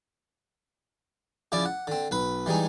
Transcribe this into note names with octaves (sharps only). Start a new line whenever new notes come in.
C#3 F3 E4 D5 D6
F#5
D3 C4
B1 B4 B5
E3 G3 G#3 D#4